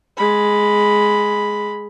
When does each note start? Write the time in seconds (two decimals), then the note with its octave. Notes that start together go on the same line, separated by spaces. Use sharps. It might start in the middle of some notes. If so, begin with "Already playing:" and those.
0.17 G#3 B5